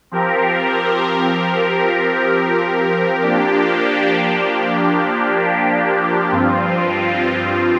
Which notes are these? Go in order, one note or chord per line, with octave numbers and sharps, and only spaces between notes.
F3 C4 G4 A#4
F3 A#3 D4 G4
G2 F3 C4 F4